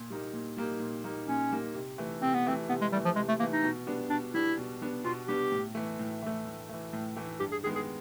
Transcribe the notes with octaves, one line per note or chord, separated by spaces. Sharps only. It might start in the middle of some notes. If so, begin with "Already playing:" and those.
Already playing: A#2
G3 A#3 D#4
A#2
G3 A#3 D#4
A#2
G3 A#3 D#4
A#2 C#4
G3 A#3 D#4
C3
E3 A3
C3 C4
B3
E3 A3 C4
C3 B3
G#3
E3 G3 A3
F3
C3 G#3
A3
E3 A3 A#3
D#4
B2
G3 B3 D4
B2 D4
G3 B3 D4 E4
B2
G3 B3 D4
B2 F4
G3 B3 D4 G4
A2
E3 A3
A2
E3 A3
A2
E3 A3
A2
E3 A3
G2 G4
G#4
D#3 G#3 B3 G#4
G#4